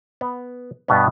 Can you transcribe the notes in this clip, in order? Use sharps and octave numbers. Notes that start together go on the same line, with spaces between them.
B3
G2 B2 B3